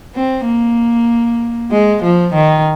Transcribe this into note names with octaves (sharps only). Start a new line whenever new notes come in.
C4
A#3
G#3
F3
D#3